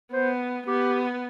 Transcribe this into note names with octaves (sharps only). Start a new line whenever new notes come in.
B3 C5
B3 G4